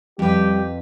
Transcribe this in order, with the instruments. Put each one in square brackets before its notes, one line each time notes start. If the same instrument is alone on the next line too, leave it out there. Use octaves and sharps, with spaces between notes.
[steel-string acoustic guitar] F2 B4 [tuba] G3 [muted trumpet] G4